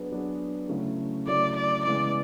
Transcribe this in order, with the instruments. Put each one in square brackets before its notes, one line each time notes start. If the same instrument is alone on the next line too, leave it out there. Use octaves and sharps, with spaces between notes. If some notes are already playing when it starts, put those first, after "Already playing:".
Already playing: [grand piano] F#3 B3 D4 G#4 B4
F#3 B3 D4 G#4 B4
C#3 F#3 A3 C#4 E4
[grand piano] C#3 F#3 A3 C#4 E4 [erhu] D5
[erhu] D5
[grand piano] C#3 E3 G#3 B3 E4 [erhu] D5